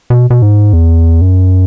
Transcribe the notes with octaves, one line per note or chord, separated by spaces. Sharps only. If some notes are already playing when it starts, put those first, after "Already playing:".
B2
B2
G#2
E2
F#2